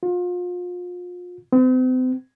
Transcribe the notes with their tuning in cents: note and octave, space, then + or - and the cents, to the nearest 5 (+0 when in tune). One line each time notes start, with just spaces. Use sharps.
F4 +35
C4 -40